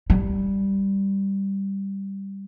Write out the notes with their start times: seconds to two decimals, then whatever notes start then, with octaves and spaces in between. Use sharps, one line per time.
0.10 G3